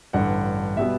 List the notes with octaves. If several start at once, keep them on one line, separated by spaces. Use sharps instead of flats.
A1 G2 D3 F#5
B2 G3 B3 E5